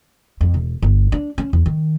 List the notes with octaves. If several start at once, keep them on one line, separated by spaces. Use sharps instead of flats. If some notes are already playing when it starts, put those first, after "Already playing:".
F2
E1
G1
D4
C#4
E2
D#3